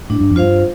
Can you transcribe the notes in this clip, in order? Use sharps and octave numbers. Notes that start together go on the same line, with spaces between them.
A2 D4
G2
F2
G2 F4 C5 F5